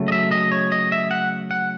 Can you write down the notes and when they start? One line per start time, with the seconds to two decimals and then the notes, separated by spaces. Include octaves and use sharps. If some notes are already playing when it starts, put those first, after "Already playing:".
Already playing: C#3 F#3 A3
0.08 D#5
0.12 E5
0.31 D#5
0.52 C#5
0.72 D#5
0.92 E5
1.11 F#5
1.51 F#5